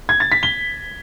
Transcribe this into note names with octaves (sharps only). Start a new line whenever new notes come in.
G#6
A6
B6
G7